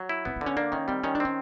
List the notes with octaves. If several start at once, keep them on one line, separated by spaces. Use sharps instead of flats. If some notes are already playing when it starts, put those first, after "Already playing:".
Already playing: F#3
E4
B3 C4
D3 C4
C#4
A#3 D4
D#3 C#4
G3 C4
D#3 C#4
D4
C4 C#4